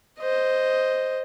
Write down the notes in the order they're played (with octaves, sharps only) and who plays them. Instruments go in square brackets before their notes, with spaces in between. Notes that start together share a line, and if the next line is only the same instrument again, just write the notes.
[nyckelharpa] C5 D#5